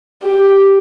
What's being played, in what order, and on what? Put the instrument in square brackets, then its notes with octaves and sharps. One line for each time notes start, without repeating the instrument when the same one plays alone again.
[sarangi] G4